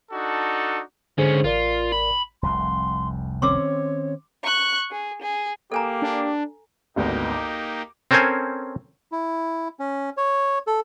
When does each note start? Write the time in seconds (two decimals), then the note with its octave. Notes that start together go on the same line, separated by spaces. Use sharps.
0.11 D4 D#4 F#4 A4
1.18 G#2 D3 C#4 G#4 C5
1.44 A1 F4 A#4 D5
1.92 B5
2.43 F1 C2 F2 C6
3.42 D#3 C4 C#4 C#5 C6 D6 E6
4.44 C#6 F#6
4.91 G#4
5.22 G#4
5.72 A#3 G4 A4 G#5 A#5
6.02 D4
6.96 G#1 D2 A#3 B3 D#4 G4
7.31 D6
8.11 C4 C#4 A4 A#4 C5 G#5
9.12 E4
9.79 C#4
10.17 C#5
10.67 A4